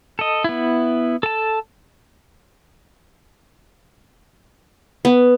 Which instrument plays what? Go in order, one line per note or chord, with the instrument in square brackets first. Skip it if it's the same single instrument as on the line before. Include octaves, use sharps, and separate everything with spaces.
[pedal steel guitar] A4 D#5
B3 E4
A4 A5
[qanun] B3